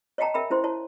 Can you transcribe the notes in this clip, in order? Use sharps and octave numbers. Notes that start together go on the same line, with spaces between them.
C#5 D#5 F5 G5 A5 A#5
A#4 E5 G5 B5
C#4 E4 C5 C6
E4 C#5 A5